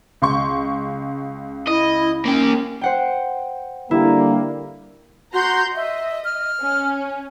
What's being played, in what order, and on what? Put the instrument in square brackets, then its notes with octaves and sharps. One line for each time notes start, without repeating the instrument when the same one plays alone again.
[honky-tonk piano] C#2 C6 C#6
[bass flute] E4 [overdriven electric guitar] D#5
[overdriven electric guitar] A#3 G5 [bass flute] C#4
[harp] C5 F#5 G5
[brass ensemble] D3 G3 A#3 [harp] E4
[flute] F#4 [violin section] A#5 C6 G6
[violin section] D#5 [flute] E5
[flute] F6
[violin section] C#4